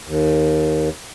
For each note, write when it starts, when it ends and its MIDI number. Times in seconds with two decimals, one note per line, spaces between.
0.06 0.89 39